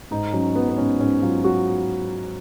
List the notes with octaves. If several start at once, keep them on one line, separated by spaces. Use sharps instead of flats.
G#2 D#4
F#3 C#4
F#3 B3
B3
G#2 C#4
G#2 C#4
F#3 F4
F#3 F#4